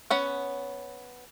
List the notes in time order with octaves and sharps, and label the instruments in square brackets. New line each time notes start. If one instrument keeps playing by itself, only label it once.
[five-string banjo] B3 C#4 F#5